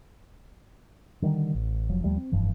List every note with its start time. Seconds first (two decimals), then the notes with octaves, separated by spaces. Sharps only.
1.22 D3 D#3 G3
1.55 A1
1.90 F1 F3 F#3
2.03 D#2 F3 G3 A3
2.17 C4
2.32 F1 G2 E3 F3